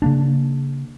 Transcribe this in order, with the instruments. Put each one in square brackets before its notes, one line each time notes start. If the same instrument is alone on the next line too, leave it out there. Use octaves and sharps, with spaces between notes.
[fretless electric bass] C#3 A#3 D4